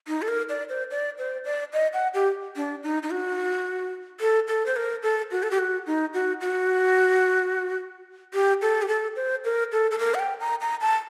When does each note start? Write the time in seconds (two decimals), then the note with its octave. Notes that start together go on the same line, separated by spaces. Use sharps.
0.08 D#4
0.22 A4
0.28 A#4
0.49 D5
0.69 C5
0.91 D5
1.18 C5
1.45 D5
1.73 D#5
1.93 F#5
2.14 G4
2.56 D4
2.83 D#4
3.03 D#4
3.11 F#4
4.20 A4
4.48 A4
4.66 C5
4.76 A#4
5.03 A4
5.31 F#4
5.43 A4
5.51 G4
5.59 F#4
5.87 D#4
6.14 F#4
6.41 F#4
8.34 G4
8.62 A4
8.82 G4
8.88 A4
9.16 C5
9.45 A#4
9.72 A4
9.91 A4
9.99 A#4
10.14 F#5
10.19 G5
10.40 A#5
10.61 A#5
10.81 A5